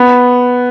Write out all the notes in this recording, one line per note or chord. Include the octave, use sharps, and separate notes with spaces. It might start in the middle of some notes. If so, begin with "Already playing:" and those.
Already playing: B3